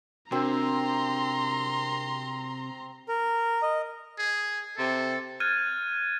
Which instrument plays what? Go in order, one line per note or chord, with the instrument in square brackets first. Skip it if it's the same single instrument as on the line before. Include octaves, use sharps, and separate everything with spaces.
[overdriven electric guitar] C3 [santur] C4 [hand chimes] D4 F#4 A#4 [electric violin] A#5 C6
[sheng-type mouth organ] A#4
D#5
[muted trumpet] G#4
[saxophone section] C3 [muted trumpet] A4
[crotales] F6 F#6 G#6 A6 D#7